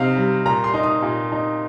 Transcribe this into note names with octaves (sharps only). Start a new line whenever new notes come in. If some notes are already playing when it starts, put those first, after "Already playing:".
Already playing: C3 D#4 F5
G3
A#2 A#5
C6
D#4
D#6
A#2
D#4